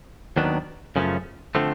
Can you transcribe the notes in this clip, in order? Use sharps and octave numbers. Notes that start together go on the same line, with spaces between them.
D#2 D#3 F#3 B3 D4
F#2 C#3 F3 A3 C#4
D3 F3 A3 C4